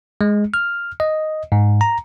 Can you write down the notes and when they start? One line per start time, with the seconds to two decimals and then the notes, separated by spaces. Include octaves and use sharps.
0.21 G#3
0.54 F6
1.00 D#5
1.52 G#2
1.81 A#5